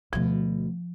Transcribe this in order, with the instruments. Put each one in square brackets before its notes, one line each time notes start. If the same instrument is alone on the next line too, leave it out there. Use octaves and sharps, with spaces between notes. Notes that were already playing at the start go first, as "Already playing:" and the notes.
[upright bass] D2 B2 [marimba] F3